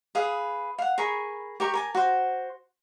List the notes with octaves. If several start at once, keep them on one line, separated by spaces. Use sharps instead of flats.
G#4 B4 F5 D#6
F5 F#5
G#4 A#4 B5 C#6
G4 A#4 C#6
A#4 G#5 A5
F#4 C5